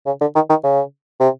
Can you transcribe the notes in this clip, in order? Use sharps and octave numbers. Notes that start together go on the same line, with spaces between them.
C#3
D3
D#3
D#3
C#3
C3